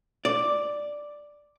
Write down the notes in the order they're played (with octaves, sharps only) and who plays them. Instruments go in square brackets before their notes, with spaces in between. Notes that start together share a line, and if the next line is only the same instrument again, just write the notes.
[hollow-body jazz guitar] D5